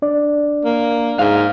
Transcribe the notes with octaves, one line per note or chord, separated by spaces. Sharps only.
D4 D5
A#3
G#2 F5